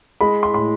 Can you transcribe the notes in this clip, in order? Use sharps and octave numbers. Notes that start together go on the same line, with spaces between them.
G#3 B5
C6
A2 C6